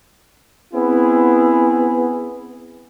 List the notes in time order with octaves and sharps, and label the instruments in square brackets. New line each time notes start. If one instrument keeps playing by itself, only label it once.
[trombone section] B3 C4 E4 G#4